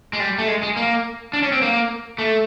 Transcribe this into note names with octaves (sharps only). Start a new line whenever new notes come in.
G#3
G3
A3
G#3
G#3
A#3
D4
C#4
C4
A#3
A3